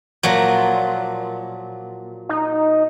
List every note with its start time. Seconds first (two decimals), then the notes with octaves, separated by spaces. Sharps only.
0.23 A#2 F3 F#3
2.29 D#4